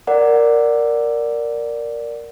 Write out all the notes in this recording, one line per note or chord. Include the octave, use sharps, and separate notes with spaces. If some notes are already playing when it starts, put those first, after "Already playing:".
A#4 D5 F#5